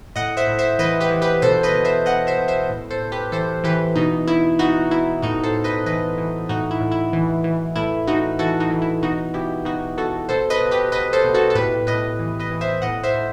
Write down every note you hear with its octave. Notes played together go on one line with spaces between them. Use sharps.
A2 D#5 F#5
C5 E5
A2
C5 E5
E3 B4 D#5
G4 B4
E3
G4 B4
B2 A4 C5
B4 D#5
B2
C5 E5
B2 D#5 F#5
C5 E5
B2
C5 E5
A2
A4 C5
A2
G4 B4
E3 A4 C5
E3 G4 B4
B2 D#4
B2 E4
B2 D#4 F#4
B2 E4
A2 D#4 F#4
A4 C5
A2
B4 D#5
E3 B4 D#5
E3
A2 D#4 F#4
E4
A2
E4
E3
E3
A2 E4
A2 D#4 F#4
E3 F#4 A4
D#4 F#4
E3
E4
B2 D#4 F#4
B2 E4 G4
B2 D#4 F#4
B2 F#4 A4
B2 A4 C5
B4 D#5
B2
G4 B4
B2 B4 D#5
A4 C5
B2
F#4 A4
A4
A2 G4 B4
A2 B4 D#5
E3
B4 D#5
E3
C5 E5
A2 D#5 F#5
C5 E5
A2